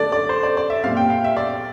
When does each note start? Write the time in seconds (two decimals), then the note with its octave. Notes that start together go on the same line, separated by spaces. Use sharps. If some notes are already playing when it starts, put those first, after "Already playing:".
Already playing: D3 A3 D4 D5
0.12 D5
0.29 C5
0.43 D5
0.57 D5
0.70 E5
0.84 A#2 G3 C4 F5
0.97 G5
1.10 F5
1.24 E5
1.37 D5